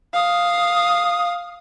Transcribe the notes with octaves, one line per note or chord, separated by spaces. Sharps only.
F5 D#6